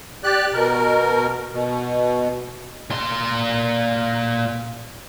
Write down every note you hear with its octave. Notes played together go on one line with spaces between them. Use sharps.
G4 D5 F#6
B2 A#4
B2
A#2 C6